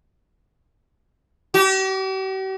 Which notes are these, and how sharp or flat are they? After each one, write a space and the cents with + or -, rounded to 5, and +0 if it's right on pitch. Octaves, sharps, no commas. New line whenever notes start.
G4 -45